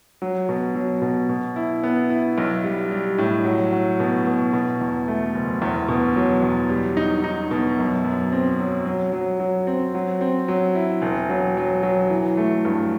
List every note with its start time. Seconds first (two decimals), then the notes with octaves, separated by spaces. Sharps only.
0.22 F#3
0.49 B2
0.75 F#3
1.02 B2
1.29 B2
1.56 E4
1.83 B3
2.10 E4
2.38 B1
2.64 G3
2.91 G3
3.18 A2
3.45 F#3
3.72 F#3
4.00 B2
4.27 B2
4.53 B2
4.81 E2
5.08 A3
5.35 F#1
5.62 E2
5.88 B2
6.16 F#3
6.43 E2
6.70 G3
6.97 D#4
7.24 D#4
7.51 B2
7.78 F#2
8.04 F#2
8.32 C4
8.59 F#3
8.85 F#3
9.13 F#3
9.40 F#3
9.67 C4
9.95 F#3
10.21 C4
10.48 F#3
10.75 E4
11.02 E1
11.29 F#3
11.57 F#3
11.83 F#3
12.10 E3
12.37 A3
12.65 G2